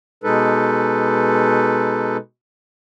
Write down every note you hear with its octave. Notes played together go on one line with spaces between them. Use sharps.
B2 G#3 D#4 A4 B4